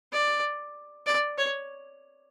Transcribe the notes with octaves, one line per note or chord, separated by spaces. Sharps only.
D5
D5
C#5